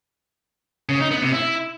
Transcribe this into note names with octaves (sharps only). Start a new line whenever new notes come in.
C#3
D#4
B3
C3
E4